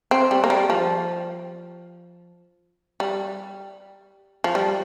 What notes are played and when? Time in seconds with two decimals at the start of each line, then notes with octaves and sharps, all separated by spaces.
0.11 C4
0.31 G3
0.44 A#3
0.50 G3
0.70 F3
3.00 G3
4.44 F3
4.55 G3